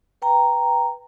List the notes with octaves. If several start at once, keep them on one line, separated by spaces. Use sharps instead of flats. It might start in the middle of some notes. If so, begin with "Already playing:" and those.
B4 G5 A#5